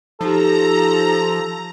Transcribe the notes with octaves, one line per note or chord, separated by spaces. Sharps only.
F3 D#4 G4 A4 A#5